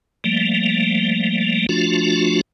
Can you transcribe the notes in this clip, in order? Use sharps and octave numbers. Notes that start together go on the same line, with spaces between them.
F3 G3 A3 A#3
F3 A3 D4 F4 F#4